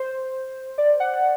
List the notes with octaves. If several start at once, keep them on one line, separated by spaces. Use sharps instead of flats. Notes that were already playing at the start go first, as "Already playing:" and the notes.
Already playing: C5
D5
F#5
F#5